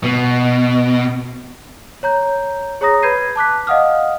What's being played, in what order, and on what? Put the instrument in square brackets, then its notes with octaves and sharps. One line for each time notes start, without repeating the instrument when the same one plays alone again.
[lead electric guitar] B2
[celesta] C#5 A#5 G6
G#4 C#5 A#5 D#6 A#6
B4 B5 G6 G#6 C7 D#7
A5 D6 F#6 B6
D#5 F5 F#5 D#6 F6